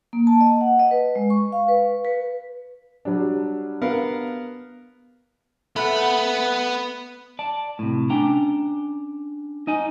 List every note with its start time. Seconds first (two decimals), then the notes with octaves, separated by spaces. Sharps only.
0.13 A#3
0.27 A5
0.41 D#5
0.61 F#5
0.79 D#5
0.91 B4
1.16 G#3
1.30 C#6
1.52 F5
1.68 B4
2.05 B4
3.05 F#3 G3 D4
3.82 B3 A#4 F5
5.76 A3 B3 B4 F#5 B5
7.39 D5 A5
7.79 A2 C3
8.10 C#4 D4 G5 A#5
9.67 D#4 D#5 G#5